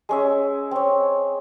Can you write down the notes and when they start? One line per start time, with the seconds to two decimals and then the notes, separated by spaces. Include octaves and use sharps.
0.09 G#3 C#4 E5
0.71 C4 C#5